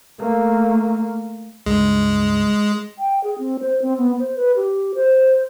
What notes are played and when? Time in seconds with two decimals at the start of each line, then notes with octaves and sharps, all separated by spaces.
0.19 A3 A#3
1.66 C#2 G2 G#3
2.99 G5
3.24 G#4
3.39 C4
3.60 C5
3.82 C4
3.97 B3
4.19 C5
4.36 B4
4.56 G4
4.95 C5